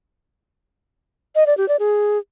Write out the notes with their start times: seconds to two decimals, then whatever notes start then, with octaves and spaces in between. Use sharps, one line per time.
1.35 D#5
1.46 D5
1.57 G4
1.68 D5
1.79 G#4